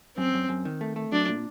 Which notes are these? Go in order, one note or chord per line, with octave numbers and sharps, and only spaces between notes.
F#2 C4
F#2
F#2
D#3
A3
A3
F#3 D4
A#2